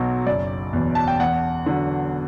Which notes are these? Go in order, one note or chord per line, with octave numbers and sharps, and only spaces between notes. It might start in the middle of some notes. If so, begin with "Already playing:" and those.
Already playing: B1 B2 F#3
F#1 D5
E2 B2
A5
G5
E2 F#5
D3 F#3